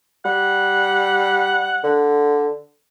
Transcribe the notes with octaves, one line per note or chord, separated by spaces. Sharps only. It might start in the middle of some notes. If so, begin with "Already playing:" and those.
G3 F#5
D3